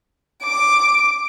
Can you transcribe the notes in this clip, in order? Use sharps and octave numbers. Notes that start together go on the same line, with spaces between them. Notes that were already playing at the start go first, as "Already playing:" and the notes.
D6